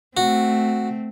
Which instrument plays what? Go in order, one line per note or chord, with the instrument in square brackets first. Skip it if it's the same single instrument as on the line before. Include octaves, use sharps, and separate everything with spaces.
[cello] A3 C4 [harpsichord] F#4